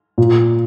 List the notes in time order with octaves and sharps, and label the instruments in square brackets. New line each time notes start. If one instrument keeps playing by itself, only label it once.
[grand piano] A#2